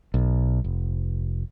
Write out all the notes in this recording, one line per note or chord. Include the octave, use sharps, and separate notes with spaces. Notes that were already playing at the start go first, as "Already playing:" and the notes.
B1
F1